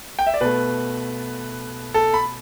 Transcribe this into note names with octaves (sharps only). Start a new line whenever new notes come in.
G5
E5
D5
B2 A3 B4
A4
B5